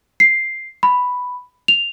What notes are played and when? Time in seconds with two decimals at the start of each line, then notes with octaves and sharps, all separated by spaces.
0.20 C7
0.83 B5
1.68 F7